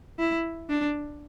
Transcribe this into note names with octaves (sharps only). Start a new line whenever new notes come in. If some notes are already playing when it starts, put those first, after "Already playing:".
E4
D4